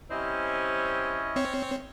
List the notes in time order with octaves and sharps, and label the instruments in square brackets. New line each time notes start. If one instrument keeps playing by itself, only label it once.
[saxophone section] G3 C4 C5 [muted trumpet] C#4 [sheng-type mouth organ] E4 D#5
[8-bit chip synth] C4 C#5